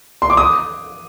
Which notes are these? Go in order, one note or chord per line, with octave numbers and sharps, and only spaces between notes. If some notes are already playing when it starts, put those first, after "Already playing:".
C6
D6
D#6